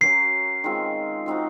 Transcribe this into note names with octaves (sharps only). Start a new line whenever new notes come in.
F#3 C#4 F#4 A#4 C7
D#3 G#3 C4 F4
F3 C4 D#4 F#4